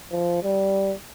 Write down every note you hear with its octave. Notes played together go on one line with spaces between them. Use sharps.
F3
G3